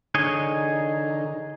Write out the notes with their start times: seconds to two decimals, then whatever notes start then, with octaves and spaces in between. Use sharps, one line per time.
0.15 D3 D#4 G#4 C#5 D#5